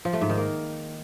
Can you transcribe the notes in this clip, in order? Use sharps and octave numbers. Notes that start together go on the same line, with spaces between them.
F3
A3
G#2
D#3
A#3